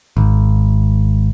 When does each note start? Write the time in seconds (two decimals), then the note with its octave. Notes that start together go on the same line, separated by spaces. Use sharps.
0.17 G#1